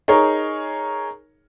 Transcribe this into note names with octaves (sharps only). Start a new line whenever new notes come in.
D#4 G#4 A#4 C#5